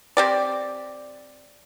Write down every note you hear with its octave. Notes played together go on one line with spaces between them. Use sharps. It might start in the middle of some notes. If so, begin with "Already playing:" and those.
C4 G4 D5